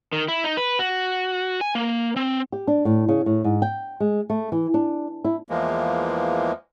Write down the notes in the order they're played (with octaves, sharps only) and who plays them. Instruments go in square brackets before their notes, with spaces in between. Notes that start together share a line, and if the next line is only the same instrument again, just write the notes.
[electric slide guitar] D#3
E4
D#4
B4
F#4
G#5
A#3
C4
[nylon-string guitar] G4
D4
A2
C#3
A2
G#2
G5
G#3
A3
E3
D4
E4
[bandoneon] E2 E3 F3 G#3 A#3